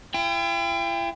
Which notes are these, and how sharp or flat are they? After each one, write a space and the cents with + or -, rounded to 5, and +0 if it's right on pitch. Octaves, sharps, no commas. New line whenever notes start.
E4 +45 G5 +25